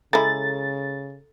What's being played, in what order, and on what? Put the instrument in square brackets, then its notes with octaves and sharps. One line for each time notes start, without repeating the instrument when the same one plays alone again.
[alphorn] C#3 [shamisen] G#3 E4 [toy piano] A4 A#5 [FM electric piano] A6